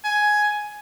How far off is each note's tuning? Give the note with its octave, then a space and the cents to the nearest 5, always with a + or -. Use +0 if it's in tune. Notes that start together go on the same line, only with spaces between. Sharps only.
G#5 +10